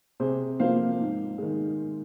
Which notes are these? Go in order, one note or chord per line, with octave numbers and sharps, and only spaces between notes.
C3 G#4 C5
F3 A#3 C5 F5
G#2
D#3 G#3